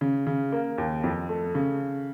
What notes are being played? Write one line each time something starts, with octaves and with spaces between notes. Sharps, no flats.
C#3
C#3
A#3
D#2
F2
A3
C#3